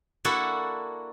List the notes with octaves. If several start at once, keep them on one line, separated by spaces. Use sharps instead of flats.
A#3 D4 E4 F#4 A4 F#5